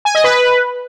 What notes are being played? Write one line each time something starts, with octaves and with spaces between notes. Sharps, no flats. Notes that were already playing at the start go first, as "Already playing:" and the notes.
G#5
D#5
B4